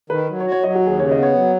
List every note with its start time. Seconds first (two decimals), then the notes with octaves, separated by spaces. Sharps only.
0.10 D#3 B4
0.28 F#3
0.40 C#5
0.46 F#4
0.52 C#5
0.63 F#3 D#5
0.75 F#4
0.81 D#2
0.86 G#4
0.98 C#3 C#5
1.11 D#5
1.17 B3
1.23 C#5
1.35 F#3